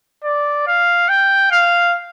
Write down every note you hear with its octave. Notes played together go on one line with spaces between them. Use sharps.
D5
F5
G5
F5